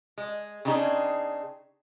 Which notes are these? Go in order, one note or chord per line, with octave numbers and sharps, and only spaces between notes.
G#3
C#3 C4 D4 D#4 G#4